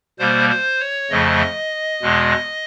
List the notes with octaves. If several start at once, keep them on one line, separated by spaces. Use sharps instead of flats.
B2 G3 A#3 C5
C5
C#5
F2 C#3 F3 A3 D#5
E2 B2 G#3